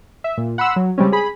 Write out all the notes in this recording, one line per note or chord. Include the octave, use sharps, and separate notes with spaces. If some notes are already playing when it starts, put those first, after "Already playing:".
E5
A#2
F#5 B5 C6 E6
F#3
C#3 G3 G#3 C4 C#4
G#4 B5